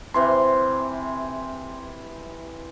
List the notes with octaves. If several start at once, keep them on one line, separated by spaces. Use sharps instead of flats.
C3 E3 C6